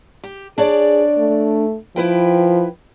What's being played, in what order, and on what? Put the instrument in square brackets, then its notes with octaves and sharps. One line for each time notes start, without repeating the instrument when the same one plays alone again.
[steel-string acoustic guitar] G4
[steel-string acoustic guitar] D4 C#5 D5 [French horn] G#4
[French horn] A3
[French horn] F3 [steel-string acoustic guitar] E4 B4 G5